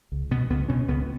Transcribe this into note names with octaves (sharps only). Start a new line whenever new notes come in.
C#2
B2 B3
C#2 B3
B2 C#4
C#2 B3